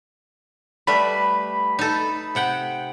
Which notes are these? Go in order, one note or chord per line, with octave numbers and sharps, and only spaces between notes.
G3 A3 B4 B5
D#4 A4
C3 F#5 G5